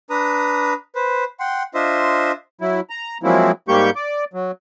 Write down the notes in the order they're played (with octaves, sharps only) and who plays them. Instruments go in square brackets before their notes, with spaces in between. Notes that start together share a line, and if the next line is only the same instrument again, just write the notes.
[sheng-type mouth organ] D4 B4 A#5 D#6
B4 C5
F#5 G5 C6
D4 F4 C5 D#5 E5 C6
[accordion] F#3 E4
A#5
F3 F#3 G#3 A#3 C4 E4
G#2 G3 A#3 G4 C#6 G6
D5
F#3